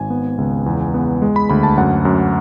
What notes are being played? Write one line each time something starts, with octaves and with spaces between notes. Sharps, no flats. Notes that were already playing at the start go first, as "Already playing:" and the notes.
Already playing: G#1 G#5
B3
C#2
E2
B3
G#3
B5
D2 B5
A5
F#2 F#5
F#2